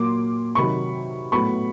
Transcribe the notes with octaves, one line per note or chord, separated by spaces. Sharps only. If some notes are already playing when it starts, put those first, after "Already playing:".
Already playing: A#2 F#3 A#3 C6 D6
C3 D#3 F#3 B5 C#6
A2 F#3 B3 B5 C#6